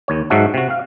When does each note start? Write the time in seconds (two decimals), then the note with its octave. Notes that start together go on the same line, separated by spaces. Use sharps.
0.08 D#2 C#5
0.30 G#2 F#3 F#4 E5 A5
0.54 C3 F#4
0.70 F5